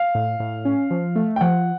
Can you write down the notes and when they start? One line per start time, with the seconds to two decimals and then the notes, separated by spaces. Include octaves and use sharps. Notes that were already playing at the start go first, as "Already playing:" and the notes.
Already playing: F5
0.15 A2
0.40 A2
0.65 C#4
0.91 F3
1.16 A3
1.36 G5
1.41 F3 F#5